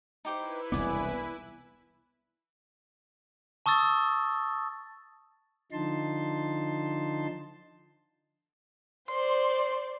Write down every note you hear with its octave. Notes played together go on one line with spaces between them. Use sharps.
D#4 E4 G4 B4 C5
E1 C2 B3 D5 G#5
A5 C#6 D#6 E6 A6
D3 F3 D#4 A5 C6
C5 D5 C6